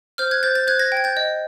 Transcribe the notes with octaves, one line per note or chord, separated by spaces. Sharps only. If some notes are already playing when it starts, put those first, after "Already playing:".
C5 F6 G6
F#6 G#6
C5 G6 A6
G6 A6
C5 F#6 G#6
G#6 A#6
G5
G#6
G6 A6
D#5